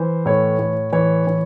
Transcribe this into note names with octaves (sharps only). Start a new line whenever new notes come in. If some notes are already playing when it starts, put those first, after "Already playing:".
Already playing: E3 C5
A2 C#5
A2
E3 C#5
E3